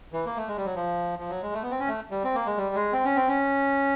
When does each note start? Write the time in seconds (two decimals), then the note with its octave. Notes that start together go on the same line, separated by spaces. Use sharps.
0.13 E3
0.26 A#3
0.36 A3
0.48 G#3
0.57 G3
0.65 F#3
0.75 F3
1.19 F3
1.29 F#3
1.42 G#3
1.53 A3
1.63 B3
1.71 C4
1.80 C#4
1.88 A3
2.11 G3
2.24 C4
2.35 A#3
2.46 G#3
2.58 G3
2.75 G#3
2.93 C4
3.05 C#4
3.16 C4
3.28 C#4